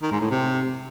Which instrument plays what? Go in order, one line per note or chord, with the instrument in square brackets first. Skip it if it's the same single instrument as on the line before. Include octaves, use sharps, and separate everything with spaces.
[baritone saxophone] D#3
G#2
A2
C3